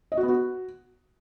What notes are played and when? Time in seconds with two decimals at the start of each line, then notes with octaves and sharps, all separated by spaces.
0.12 D#5
0.17 F#4
0.23 B3
0.29 F#4